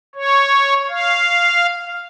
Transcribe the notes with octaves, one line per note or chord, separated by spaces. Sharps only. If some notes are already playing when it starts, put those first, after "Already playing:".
C#5
F5